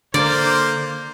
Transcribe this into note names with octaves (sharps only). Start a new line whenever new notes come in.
D3 A#3 C5 D5